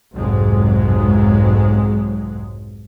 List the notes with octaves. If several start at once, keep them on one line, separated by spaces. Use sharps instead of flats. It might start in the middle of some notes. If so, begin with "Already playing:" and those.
B1 F2 G#2 C3 F#3 G#3